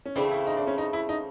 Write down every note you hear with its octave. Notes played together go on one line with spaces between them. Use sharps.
C#4
C#3 E3 A3 C4 D4
E4
D#4
D4
C#4
D#4
E4
D#4